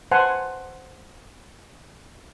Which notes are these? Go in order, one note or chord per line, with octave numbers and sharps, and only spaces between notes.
C5 F#5 G#5 A5 C6